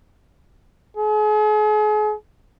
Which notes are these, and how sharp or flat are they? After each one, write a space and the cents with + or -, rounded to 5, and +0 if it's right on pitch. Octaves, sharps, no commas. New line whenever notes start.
G#4 +40